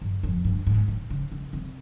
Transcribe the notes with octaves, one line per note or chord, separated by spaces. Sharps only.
G2
F2
G2
G#2
A#2
C#3
C#3
C3